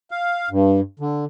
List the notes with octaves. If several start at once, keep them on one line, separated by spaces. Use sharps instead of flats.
F5
G2
D3